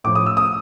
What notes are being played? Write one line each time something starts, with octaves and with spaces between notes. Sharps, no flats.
A2 F3 D6
D#6
E6
D#6